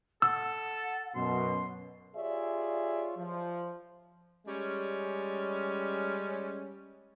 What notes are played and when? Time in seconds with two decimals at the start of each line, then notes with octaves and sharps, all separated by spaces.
0.22 A4 F#5 E6
1.15 F#2 B2 C6
2.16 F4 G4 G#4 C#5 D5 E5
3.17 F3
4.46 G3 G#3 C#4